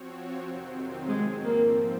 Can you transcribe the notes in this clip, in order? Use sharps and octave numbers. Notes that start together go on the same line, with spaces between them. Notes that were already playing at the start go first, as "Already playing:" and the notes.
Already playing: F3 C4 F#4 C#5
F2 C3 D#3 F#3 C4
G#2 F3 G#3 C4
A#3